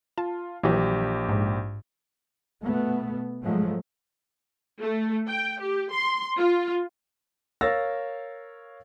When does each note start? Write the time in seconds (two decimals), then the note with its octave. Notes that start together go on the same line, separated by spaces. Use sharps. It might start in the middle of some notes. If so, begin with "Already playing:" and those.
0.18 F4 A5
0.63 A#1 E3 F#3 G4
1.29 G#2
2.62 B2 A3 B3
3.43 G#2 F3 F#3 G#3 A3
4.79 A3
5.28 G5
5.59 G4
5.91 C6
6.37 F4
7.61 A#4 C#5 F5 E6 A6 A#6